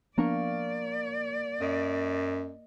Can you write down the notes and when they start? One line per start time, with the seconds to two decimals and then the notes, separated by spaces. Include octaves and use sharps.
0.18 F3 A#3 B3 D4 A#4 D5 C#6
1.61 F#2 D#5